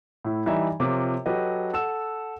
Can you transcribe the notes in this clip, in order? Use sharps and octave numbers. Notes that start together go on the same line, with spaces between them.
A2 E4
E3 G3 D#4 E5 A#5
C3 F3 F4 A#4 C#5 D6
F#3 G4 A4 B4 D#5
A4 F#5 E6 E7